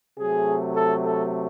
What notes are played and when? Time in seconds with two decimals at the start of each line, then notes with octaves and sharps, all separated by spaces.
0.18 C3 F#3 A3 G#4
0.74 A4
1.02 A4